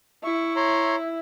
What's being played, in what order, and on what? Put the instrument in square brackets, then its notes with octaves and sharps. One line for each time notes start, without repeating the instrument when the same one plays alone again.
[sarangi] E4 [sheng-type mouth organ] C#6
[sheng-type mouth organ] C#5 A#5 C6